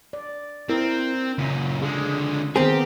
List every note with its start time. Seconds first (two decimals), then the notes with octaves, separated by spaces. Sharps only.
0.13 D5
0.70 C4 E4 A#4
1.38 F#2 A#2 C#3
1.82 D3 G#3 G#4
2.56 D#3 B3 C4 G4 G#4 A#4